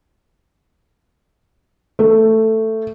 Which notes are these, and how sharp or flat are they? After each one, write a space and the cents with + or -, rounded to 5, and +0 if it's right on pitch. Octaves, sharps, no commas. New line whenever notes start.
A3 +10